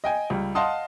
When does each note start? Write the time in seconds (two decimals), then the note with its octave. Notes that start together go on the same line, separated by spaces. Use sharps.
0.04 D#5 G5 G#5
0.30 C#2 G3
0.55 D#5 F5 F#5 A5 C6 D#6